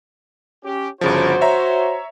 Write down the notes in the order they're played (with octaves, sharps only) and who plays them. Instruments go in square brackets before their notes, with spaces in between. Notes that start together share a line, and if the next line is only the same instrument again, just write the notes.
[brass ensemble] C#4 G4
[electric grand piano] G1 C#3 F3 [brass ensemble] F#4 C5
[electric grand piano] C#5 E5 A#5